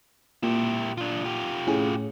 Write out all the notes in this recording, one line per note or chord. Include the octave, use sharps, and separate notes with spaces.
A#2 E4 G4
D4 F4
F4 G4
A2 C#4 G#4